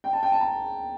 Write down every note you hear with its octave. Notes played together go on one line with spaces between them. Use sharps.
G5
A5
G5
A5
A#5